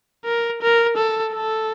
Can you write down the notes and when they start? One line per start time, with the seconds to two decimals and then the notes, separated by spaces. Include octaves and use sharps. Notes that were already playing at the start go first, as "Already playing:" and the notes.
0.25 A#4
0.62 A#4
0.97 A4
1.34 A4